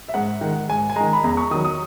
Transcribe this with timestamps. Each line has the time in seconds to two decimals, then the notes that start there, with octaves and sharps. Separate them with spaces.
0.08 E5
0.14 G#2 F#5
0.41 D#3 G#3
0.69 G#2 G#5
0.90 G#5
0.96 D#3 G#3 A#5
1.13 B5
1.24 E2 A#5
1.37 C#6
1.51 D#3 F#3 D#6
1.65 D#6